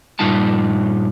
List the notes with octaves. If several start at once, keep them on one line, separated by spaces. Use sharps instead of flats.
G2 A#2 G3 D#4 F4 A5